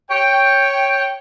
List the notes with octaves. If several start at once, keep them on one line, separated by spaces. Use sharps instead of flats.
C#5 G5